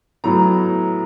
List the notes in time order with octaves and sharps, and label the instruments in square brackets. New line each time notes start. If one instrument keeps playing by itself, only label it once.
[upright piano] A2 F#3 B3 A#5